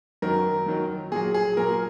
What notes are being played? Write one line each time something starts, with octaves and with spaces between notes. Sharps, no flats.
F#2 D#3 F#3 A#4
F#2 D#3 F#3
A#2 F#3 G#4
G#4
A#2 F#3 A#4